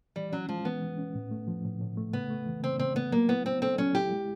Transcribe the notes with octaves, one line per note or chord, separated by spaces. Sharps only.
E3 G3
F#3 C#4
F3 G#3
E3 B3
E3
C#4
A2
A3
F3
A2
A2
A3
C#3 B3
A3
E3
C#3 C4
C#3 C4
A3 B3
F#3 A#3
B3 E4
B3 C4
C4 A4
F#3 C#4
E4 G4
G#3